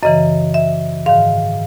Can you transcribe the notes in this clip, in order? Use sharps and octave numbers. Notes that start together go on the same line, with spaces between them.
F#2 C#3 E3 D#5
E5
G#2 D#3 F5